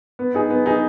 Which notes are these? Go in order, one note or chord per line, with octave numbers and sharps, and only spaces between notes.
B3
D#4 G#4
B3
D#4 G#4